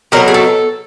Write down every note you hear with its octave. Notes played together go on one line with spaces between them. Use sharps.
B2 F#3 A3 A#4
G#4
A4